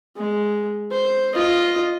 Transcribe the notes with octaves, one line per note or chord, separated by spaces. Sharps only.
G#3
C5
F4 D#5